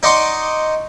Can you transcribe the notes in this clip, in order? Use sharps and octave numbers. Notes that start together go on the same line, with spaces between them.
D#4 D5 D#5 F#5 C6 C#6